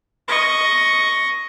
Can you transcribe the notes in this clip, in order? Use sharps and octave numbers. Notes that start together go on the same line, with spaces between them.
D#5 C#6